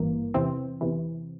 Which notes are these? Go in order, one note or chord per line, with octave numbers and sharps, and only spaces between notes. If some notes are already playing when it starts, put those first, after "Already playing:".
Already playing: G#1 G2 E3 A#3
E2 C3 E3 C4
E2 C3 E3